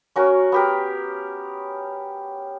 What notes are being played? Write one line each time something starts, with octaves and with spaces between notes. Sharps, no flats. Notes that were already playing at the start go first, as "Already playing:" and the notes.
C#4 F#4 A#4
B3 G4 A#4